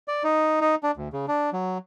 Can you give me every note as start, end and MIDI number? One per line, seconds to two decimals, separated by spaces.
0.08 0.23 74
0.24 0.60 63
0.61 0.75 63
0.83 0.91 62
0.97 1.08 38
1.13 1.26 49
1.28 1.50 62
1.53 1.78 54